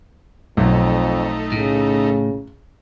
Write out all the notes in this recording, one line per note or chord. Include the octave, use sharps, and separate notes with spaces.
B1 F2 A3 D#4
A2 C#3